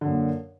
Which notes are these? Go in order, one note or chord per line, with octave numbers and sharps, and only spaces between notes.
F#2 A#2 D3